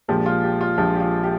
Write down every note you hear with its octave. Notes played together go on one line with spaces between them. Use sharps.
A#1 A#2 F3 G#3 G4
F4
G4
F4
A#1 A#2 F3 G#3 G4
G4
F4
G4